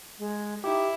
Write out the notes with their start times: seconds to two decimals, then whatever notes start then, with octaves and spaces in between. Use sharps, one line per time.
0.19 G#3
0.64 D#4 E4 G4